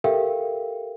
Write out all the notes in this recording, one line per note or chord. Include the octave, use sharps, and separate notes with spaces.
G4 A4 A#4 E5 F5 G5